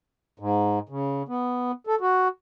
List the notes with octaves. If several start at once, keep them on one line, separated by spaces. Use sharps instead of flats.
G#2
C#3
B3
A4
F#4